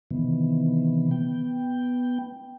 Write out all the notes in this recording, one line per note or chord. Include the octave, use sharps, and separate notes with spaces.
C3 D#3 E3 B3
B3 G5